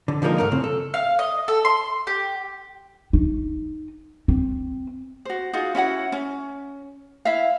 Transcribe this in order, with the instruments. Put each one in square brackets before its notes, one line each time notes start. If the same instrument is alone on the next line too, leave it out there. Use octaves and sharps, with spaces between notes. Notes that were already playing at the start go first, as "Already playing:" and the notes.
[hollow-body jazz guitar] D3
D3 F3 G#3 A#3 D#4 A#4
C2 G2 D3 A3 A#4
A2 C#3 C4
A4
[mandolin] F5
D#5
A4
C6
G4
[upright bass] D#4
C4
[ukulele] F#4 C5
D#4 F4 F#4 G#4
C#4 E4 F#4 F#5
C#4
E4 E5 F5